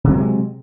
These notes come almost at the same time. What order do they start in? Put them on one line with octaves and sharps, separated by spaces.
C3 F#3 A3 G#3